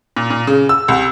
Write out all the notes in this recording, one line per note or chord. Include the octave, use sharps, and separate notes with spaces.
A#2
A#2
C#3
E6
C2